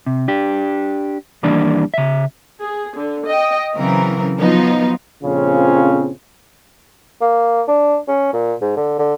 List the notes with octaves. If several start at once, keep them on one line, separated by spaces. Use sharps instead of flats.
C3
D4 G4
D#2 E3 G3 A#3 D4 D5
C#3 E5
G#4
D3
D#5 G5
C#3 E3 F#3 C4 A#4
F3 F#3 B3 D#4 F4
A#1 F2 C#3 C4 C#4 F4
A#3
D4
C#4
A#2
G#2
D3
D3